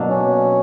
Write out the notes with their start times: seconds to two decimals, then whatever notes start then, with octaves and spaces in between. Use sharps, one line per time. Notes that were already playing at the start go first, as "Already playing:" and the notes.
Already playing: B2 F#3 A#3 D4
0.10 C#4